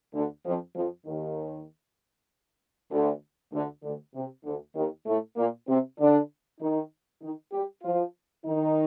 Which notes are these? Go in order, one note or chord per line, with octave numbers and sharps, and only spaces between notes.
D2 D3
F2 F3
F2 F3
D#2 D#3
D2 D3
D2 D3
D2 D3
C3
D2 D3
D#2 D#3
A2 A3
A#2 A#3
C3 C4
D3 D4
D#3 D#4
D#3 D#4
G3 G4
F3 F4
D#3 D#4